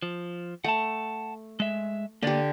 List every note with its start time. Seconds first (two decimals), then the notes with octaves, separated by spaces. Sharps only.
0.03 F3
0.64 A3 F#5 A5
1.60 G#3 E5
2.23 D3 A#3 B3 G4 D5